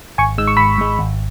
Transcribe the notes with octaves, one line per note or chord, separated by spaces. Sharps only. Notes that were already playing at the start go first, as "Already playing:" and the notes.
G#1 G#5 C#6
G#2 G#3 E6
C#6
G#1 B5 E6
G#2 G#3
G#1